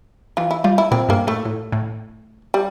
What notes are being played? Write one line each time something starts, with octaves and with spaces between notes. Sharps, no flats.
E3 F4
E4
G3 F4
E4
A#2 C4
G2 A#3
A2 A3
A2
A2
G3